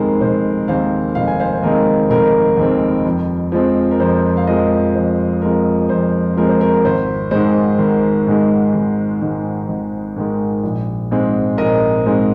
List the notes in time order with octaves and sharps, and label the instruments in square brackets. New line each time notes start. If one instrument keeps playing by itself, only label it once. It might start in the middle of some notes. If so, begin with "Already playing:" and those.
Already playing: [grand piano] F1 D#2 D#3 G#3 C4 A#4 C5
F1 C5
D#2 D#3 G#3 C4 C5 F5
F1 F5
G#5
C5 F5
C5
D#2 D#3 G#3 C4 A#4 D#5
F1 A#4
D#2 D#3 G#3 C4
F2
F3 G#3 C4
A#4
F2 C5
F5
F3 G#3 C4 A#4 D#5
F2 C5
F3 G#3 C4 A#4
F2 C5
F3 G#3 C4 A#4
C5
A#4
G#1 C5
G#2 D#3 G#3 C5
G#1 A#4
G#2 D#3 G#3
G#1
G#2 D#3 G#3
G#1
G#2 D#3 G#3
A#1
G#2 G#3 C4
A#1 A#4 D#5
G#2 G#3 C4